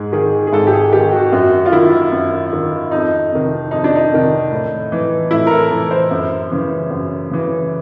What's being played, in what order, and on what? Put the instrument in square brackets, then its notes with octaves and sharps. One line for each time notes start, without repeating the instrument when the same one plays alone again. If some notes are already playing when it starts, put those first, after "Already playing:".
Already playing: [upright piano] G#2 G#4
D#3 G#4
G#4
G#2 A4
G4
G#4
D#3 G4
F#4
F#2 F#4
F4
D#3 E4
F#2
D#3
F2 D#4
C3 D#3
F2 D#4
D4
D#4
C3 D#3
A2
E3
A2 E4
A#4
A4
E3 A4
C5
F#2
C#3 E3
F#2
C#3 E3